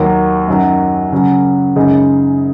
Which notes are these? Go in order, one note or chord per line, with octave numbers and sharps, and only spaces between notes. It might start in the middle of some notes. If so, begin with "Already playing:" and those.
Already playing: D#2 D#3 F#3 A#3
F#2 D#3 F#3
C#3 F#3 C#4
F#2 C#3 G#3 D#4 G#4